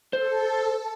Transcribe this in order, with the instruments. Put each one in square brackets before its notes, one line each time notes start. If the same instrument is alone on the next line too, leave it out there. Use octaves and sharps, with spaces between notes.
[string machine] A4 [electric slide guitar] C5